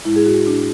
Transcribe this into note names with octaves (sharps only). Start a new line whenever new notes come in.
A2 G#3 E4
G#4
F#4
D4